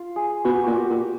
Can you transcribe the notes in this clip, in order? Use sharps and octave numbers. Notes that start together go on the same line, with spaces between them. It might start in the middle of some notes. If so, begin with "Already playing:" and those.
Already playing: F4
G#4
B2 F#4
G4
A#2 F#4
G4
A#2